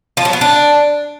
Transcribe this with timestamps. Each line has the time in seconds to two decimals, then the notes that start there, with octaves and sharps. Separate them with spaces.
0.17 F3
0.25 F#3
0.33 B3
0.41 D4